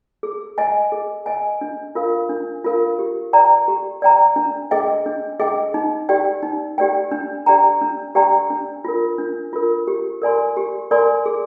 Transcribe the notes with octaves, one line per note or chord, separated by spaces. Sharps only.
G#4
D#5 G#5
G#4
D#5 G#5
D4
F4 A#4 F5
D4
F4 A#4 F5
G4
D5 G5 A#5
G4
D5 G5 A#5
D4
G#4 D#5 G5
D4
G#4 D#5 G5
D#4
G4 D5 G5
D#4
G4 D5 G5
D4
G4 D5 G5 A#5
D4
G4 D5 G5 A#5
D4
F4 A#4
D4
F4 A#4
G4
A#4 D5 G#5 C6
G4
A#4 D5 G#5 C6
G#4